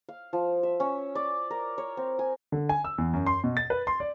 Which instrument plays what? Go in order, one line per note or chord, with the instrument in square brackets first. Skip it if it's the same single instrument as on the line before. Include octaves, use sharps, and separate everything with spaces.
[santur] F5
F3
E5
C#4
D5
A#4
C#5
C4
G#5
[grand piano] D3
G#5
E6
E2
F#2
C6
B2
A6
B4
C6
D5